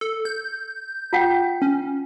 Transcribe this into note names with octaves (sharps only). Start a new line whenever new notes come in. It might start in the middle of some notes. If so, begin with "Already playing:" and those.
A4
G6
F4 F#5 G5
C#4